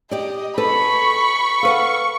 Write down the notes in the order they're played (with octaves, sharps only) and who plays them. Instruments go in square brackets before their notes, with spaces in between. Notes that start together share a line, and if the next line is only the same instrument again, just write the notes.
[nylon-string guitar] G4 D5 [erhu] D#5
[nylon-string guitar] A4 B4 [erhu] B5 [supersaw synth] C#6
[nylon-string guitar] A4 B4 F#5 [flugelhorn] F5